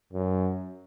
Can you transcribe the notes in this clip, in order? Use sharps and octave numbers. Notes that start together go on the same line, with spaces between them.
F#2